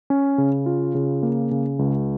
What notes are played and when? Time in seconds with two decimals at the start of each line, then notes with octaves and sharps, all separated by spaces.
0.10 C#4
0.38 C#3
0.66 F4
0.95 C#3
1.23 A#3
1.51 C#3
1.79 C#2